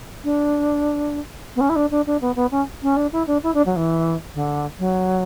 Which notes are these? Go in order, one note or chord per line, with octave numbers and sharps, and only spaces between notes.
D4
B3
C#4
E4
D4
D4
D4
B3
B3
C#4
C#4
D4
E4
D4
E4
D4
F#3
E3
D3
F#3